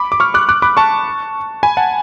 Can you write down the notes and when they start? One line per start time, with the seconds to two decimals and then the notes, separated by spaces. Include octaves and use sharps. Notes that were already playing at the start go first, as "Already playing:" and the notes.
Already playing: B5 D6
0.12 D6
0.20 C#6 F6
0.34 D6 F#6
0.49 D6 F#6
0.62 B5 D6
0.77 A5 C#6
1.63 G#5 B5
1.77 F#5 A5